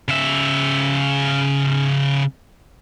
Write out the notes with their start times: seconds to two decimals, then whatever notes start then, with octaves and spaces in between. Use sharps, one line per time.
0.08 C#3 E5